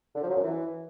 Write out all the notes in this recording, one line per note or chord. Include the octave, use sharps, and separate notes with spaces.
D3
F3
F#3
F#2
E3